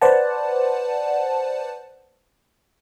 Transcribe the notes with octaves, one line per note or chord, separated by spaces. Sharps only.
B4 C5 D5 F#5 A5